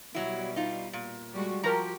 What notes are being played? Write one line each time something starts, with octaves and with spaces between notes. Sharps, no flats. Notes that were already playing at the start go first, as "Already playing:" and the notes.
B2 F#3 G3 E4
D#4 F4
A#2
G3 G#3 F#4
F3 F#4 G4 A#4 A#5